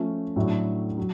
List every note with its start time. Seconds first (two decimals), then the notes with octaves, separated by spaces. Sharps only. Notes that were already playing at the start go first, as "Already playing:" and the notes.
Already playing: F3 A3 C#4
0.36 A2 F#3 A3 D4
0.98 F#3